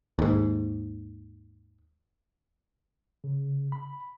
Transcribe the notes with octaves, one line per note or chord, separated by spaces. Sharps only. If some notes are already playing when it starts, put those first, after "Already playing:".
D#2 G#2
C#3
B5